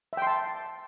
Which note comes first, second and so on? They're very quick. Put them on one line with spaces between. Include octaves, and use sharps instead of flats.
E5 G5 C6 A5